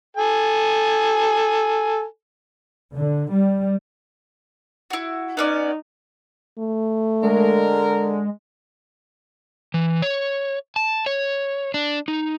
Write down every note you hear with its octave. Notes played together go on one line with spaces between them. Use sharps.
A4 G#5
D3
G3
E4 F#4
B3 C#4 D#4 D5
A3
D3 G#3 A#4
E3
C#5
A5
C#5
D4
D#4